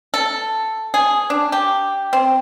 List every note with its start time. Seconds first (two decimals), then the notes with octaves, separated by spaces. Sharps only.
0.14 A4
0.94 G#4
1.30 D4
1.52 G4
2.13 C4